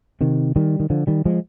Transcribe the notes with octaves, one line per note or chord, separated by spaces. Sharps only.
C3 D#3
D#3 G3
D#3
D3 F3
D#3 G3
F3 G#3